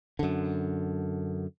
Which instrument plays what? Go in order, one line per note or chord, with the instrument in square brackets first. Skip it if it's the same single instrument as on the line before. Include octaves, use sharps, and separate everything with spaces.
[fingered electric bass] F#2 D3